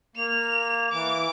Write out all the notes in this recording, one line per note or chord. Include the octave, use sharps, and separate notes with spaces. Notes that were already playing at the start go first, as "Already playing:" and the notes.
A#3 F7
E3 D6